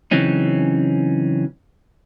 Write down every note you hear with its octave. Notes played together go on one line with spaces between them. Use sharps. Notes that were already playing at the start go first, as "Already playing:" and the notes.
C#3 E3 F#3 C4 C#4 D#4